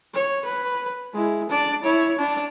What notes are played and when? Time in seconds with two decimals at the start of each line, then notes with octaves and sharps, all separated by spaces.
0.14 C#5
0.45 B4
1.13 G#3 E4
1.50 D4 D5
1.83 E4 C#5
2.19 D4